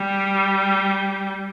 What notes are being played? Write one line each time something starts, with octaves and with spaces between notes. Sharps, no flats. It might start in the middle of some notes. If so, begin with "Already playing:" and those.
Already playing: G3